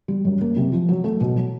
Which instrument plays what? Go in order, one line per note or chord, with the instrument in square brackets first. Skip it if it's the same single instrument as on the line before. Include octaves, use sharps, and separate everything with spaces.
[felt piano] G3
F#2
A#3
C3
F3
F#3
A3
B2
F#3